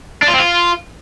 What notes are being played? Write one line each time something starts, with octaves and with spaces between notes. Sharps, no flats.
D4
F4
C4
F4